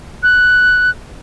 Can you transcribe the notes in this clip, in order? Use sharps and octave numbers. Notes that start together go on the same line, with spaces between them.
F#6